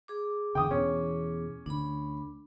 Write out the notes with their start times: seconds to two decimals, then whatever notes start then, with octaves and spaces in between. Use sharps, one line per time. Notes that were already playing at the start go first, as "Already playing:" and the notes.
0.08 G#4 D6
0.55 E2 D3 G5 D#6
0.71 E2 B2 E3 C#4
1.66 D2 D3 D4 B5